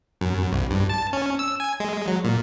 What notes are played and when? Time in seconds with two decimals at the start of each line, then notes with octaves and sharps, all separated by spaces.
0.21 F#2
0.53 C2
0.71 G2
0.90 A5
1.13 C#4
1.39 E6
1.60 G#5
1.80 G#3
2.07 F#3
2.25 A#2